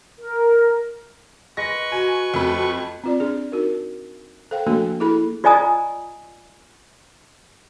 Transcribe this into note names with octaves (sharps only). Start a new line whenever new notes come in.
A#4
G#3 B4 C#6 A#6
F#4 G#5
F2 A3 B5
C4 F4 D5
D4 G#4
D#4 F#4 A#4
A4 C5 F5 G5
F3 A3 A#3 D4 F#4 A4
E4 G#4 A4 B5
F4 D5 D#5 G#5 A#5 D#6